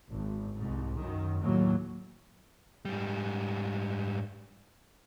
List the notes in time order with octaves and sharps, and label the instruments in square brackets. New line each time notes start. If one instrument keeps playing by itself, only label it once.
[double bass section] G#1
C2 G#2
F#2 D#3
D#2 A2 F#3 A#3
[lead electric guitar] G#2 G3